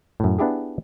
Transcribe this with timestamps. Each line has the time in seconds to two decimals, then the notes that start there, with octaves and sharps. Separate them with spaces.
0.20 F#2 A2
0.39 B3 D4 E4 G4 G#4